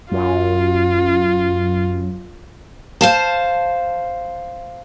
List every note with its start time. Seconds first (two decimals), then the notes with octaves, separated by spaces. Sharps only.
0.11 F#2 F4
3.01 C5 F5 A5